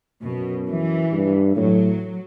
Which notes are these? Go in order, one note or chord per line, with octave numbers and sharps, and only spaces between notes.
F#2 B2
E3
G2
A2 F#3